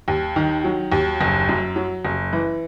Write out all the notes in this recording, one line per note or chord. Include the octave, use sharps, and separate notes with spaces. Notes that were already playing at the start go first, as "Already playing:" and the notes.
D#2
D#3
F#3
D#2
F#1
F#2
F#3
F#1
E3